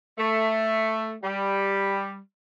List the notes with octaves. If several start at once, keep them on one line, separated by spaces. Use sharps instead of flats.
A3
G3